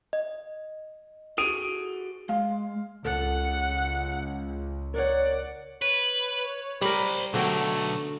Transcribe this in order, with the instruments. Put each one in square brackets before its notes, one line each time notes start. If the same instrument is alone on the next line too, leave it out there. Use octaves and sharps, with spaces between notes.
[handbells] D#5
[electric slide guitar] F#4 G#4 A4 [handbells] D#6 [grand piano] D7 D#7 F7
[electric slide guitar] G#3 [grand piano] F5
[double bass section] C#2 [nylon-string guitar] A4 [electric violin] F#5
[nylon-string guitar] A#4 C#5 [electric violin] D5 F#5
[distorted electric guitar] B4 [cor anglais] C#5
[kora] G3 A#4 [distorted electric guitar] C5 B5
[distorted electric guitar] B2 F#3 [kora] D3 F#4 G5 [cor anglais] A3